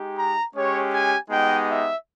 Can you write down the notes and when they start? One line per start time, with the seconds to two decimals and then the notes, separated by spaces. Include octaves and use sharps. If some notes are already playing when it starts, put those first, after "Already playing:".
Already playing: G#3 D#4 G4
0.16 A#5
0.54 G#3 C#4 G4 C#5
0.92 G#5
1.30 G#3 B3 D#4 G4 G5
1.68 E5